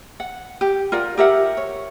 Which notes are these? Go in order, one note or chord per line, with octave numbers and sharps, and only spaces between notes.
F#5
G4
F4 A#4 D5 F#5
G4 A#4 E5 F#5
C#5